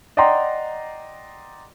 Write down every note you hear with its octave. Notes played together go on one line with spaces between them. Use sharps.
D5 D#5 F#5 G5 A#5 C6